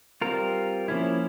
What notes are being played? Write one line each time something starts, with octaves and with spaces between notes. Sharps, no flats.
G3 C4 F4 A#4
F3 A#3 C#4 E4